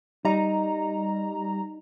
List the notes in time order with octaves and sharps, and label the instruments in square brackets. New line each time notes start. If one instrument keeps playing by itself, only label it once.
[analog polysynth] G3 A#5 [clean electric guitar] D#4